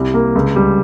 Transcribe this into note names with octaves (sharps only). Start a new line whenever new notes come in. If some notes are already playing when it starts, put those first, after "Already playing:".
Already playing: C2 G3
A#3
C#2
G3